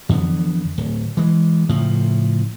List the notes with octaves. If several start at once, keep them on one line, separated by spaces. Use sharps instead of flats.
F2 D3 E3 B3
D1
E3 G#3
A2 C#3 F3